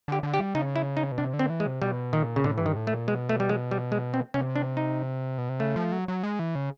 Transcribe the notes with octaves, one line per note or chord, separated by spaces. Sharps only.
D3 G4
D3
G4
G3
C#3 D#4
E4
D#4
B2
C3 D4
D3
C4
E3
G#3
C3
B2 G3
A#2 D#3
C#3
A2 D3
G2 E3
D#3
A2
A3
A#2
B2 G#3
A3
G3
G#3
G3
G#3
C4
C3 C#4
D4
D#4
B2
C3
C#3 A3
F3
F#3
F#3
G#3
E3
C#3